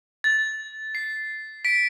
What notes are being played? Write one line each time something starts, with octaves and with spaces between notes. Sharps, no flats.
A6
C7
B6 D7